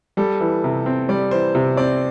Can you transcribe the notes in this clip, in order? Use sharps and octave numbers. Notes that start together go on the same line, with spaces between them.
G3 A4
E3
C3
C4
G3 D5
E3 C5
C3
C4 D5